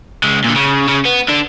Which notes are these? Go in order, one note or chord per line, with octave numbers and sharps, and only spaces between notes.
C#3 G#3
A#2 D3
C#3
C#3
B3
D3 D4